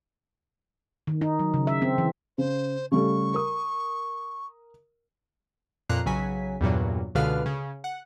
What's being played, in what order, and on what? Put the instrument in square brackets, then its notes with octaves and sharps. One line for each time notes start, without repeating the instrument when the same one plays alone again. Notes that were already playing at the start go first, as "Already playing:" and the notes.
[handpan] D#3
D#4
F#3
C#3
E5
C4
E3
[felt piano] C#3 [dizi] C5
[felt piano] C#3 G3 A3 [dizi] C#6
[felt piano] A#4 D#6
[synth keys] F2 A#2 A#5 F#6 C7
B1 C#3 F#3 G#5 B6
E2 G2 A#2 F#3
C#2 B2 D3 B4 F5 F6
C#3
F#5